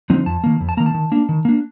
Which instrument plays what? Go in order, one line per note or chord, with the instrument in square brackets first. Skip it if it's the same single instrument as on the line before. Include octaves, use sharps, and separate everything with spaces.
[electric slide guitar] D3 F3 C4 D#4
F2 A5
D#3 A#3
F2
A5
D#3 A#3 A#5
A5
D#3
A#3 D4
D#3
A#3 D4